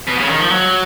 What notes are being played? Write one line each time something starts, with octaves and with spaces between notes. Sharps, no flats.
B2
C#3
D#3
F3
F#3